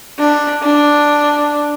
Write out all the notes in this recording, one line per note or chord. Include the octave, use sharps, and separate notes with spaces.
D4
D4